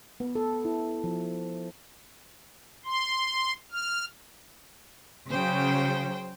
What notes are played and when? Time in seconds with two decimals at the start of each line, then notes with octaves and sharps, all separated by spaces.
0.20 B3
0.35 A4
0.65 E4
1.04 F3
2.85 C6
3.72 F6
5.30 C#3 F#3 C5 G5